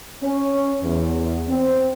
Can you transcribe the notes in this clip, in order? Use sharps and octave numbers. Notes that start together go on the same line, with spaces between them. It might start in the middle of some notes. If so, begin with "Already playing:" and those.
C#4
E2
C4